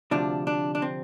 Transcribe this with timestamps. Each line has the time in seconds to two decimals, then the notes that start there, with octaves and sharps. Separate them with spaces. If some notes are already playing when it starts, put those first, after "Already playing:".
0.11 D2 C3 F3 D4
0.47 D4
0.75 D4
0.82 C4